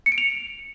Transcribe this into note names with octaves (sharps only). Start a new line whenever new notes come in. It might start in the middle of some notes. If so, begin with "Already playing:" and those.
C#7
D7
F7